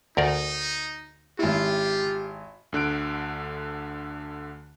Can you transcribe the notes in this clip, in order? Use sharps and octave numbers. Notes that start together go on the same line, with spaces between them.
D2 D#4 A#4 D5
G#1 E4 F4 G4
D2 D3 F#6 D7